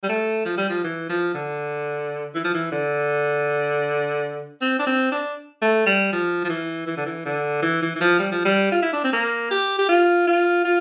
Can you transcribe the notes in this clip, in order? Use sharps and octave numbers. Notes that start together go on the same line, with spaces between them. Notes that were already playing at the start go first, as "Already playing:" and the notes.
G3
A3
F3
G3
F3
E3
F3
D3
E3
F3
E3
D3
C4
D4
C4
D4
A3
G3
F3
F3
E3
E3
D3
E3
D3
E3
E3
E3
F3
G3
F3
G3
F4
E4
D4
C4
A#3
G4
G4
F4
F4
F4